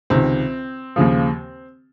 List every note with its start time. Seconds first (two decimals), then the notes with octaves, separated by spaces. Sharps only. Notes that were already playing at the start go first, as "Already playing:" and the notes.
0.10 C#2 C3 D#3 C4
0.96 D#2 C#3 F3